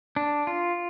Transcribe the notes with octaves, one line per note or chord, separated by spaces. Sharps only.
D4
F4